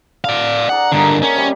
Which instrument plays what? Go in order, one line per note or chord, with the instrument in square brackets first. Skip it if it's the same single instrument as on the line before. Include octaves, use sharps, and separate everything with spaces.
[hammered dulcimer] D3 [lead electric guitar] D5 F5
[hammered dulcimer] G#4 D5 A#5 [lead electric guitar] F#5
[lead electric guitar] G2 D3 [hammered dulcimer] A#3 D#4 A#4
[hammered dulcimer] D3 [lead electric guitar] C#4
[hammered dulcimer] C3 G3